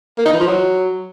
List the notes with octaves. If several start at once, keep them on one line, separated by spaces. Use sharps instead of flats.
A#3
D#4
E3
F3
F#3